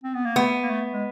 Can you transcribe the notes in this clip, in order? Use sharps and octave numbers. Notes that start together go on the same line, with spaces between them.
C4
B3
A#3
A3 B3
A#3
A3
G#3